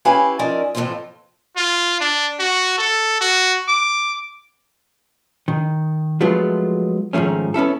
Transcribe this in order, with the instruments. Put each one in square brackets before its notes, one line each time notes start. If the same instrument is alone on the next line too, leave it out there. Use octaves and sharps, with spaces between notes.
[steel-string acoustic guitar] C#4 E4 G4 B4 F5 G#5
F3 C#4 D#4 A#4 D5 E5
F2 A2 C#3 E3 C4 F4
[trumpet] F4
D4
F#4
A4
F#4
D6
[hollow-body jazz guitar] D#3
F3 F#3 G#3 A3 B3 F4
G#2 D#3 F3 A3 C#4
B3 C#4 E4 A4